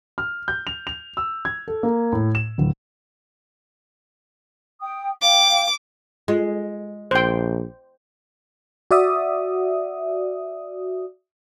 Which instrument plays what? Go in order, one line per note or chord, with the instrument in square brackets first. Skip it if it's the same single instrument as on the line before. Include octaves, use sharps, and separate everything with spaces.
[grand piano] F6
G6
F7
F7
E6
G#6
A4
A#3
A2
E7
D1
[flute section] G5 D#6
[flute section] F5 G5 [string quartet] D6
[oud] G#3 [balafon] F4
[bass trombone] A#1 [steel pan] C5 G5
[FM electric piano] F#4 D5 E5 D#6